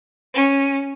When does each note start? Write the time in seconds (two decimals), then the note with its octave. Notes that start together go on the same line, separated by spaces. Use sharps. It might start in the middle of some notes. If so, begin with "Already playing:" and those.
0.34 C#4